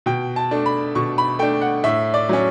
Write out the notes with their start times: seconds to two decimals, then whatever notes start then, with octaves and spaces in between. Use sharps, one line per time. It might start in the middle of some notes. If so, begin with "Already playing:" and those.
0.06 B2 G5
0.36 A5
0.51 A3 D4
0.66 B5
0.95 B2 C#6
1.18 B5
1.39 A3 D4 G5
1.61 F#5
1.84 A2 E5
2.14 D5
2.29 F#3 C#4